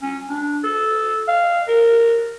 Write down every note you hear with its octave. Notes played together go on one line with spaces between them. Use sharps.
C#4
D4
A4
F5
A#4